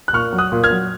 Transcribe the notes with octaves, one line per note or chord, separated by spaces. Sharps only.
F#6
A#2 C#6 F6
F#3
D#6 F#6
A#2
F6 G#6
F#3